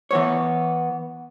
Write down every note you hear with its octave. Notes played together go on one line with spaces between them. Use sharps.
E3 B3 C#5